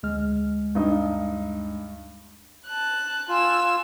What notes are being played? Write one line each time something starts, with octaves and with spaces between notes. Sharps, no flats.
D2 G#3 F6
G2 D#4
A5 F#6
F4 G#5 E6